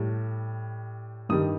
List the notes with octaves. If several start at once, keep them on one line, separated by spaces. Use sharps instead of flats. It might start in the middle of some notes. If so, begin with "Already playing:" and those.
Already playing: A2 G3
G2 D#3 G3 D#6